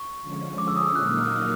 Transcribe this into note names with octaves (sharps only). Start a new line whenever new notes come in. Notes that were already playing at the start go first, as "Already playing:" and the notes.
Already playing: C#6
D3 F3 G#3 C#4
D6
E6
D#6
E6
A#2 F#3 A#3 D#4 F#6
F6
F6
F6